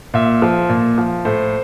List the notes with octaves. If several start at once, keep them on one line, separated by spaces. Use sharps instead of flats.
A#2 E5
F3
A#2
F3
A2 C5